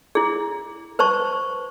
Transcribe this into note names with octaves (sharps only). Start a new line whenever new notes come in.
E4 G#4
B4 C5 A5 C#6